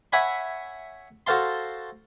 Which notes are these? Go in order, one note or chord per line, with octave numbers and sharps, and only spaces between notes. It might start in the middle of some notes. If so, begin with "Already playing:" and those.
C#5 E5 F#5 G#5 B5
F#4 A4 C5 F5 A5 C6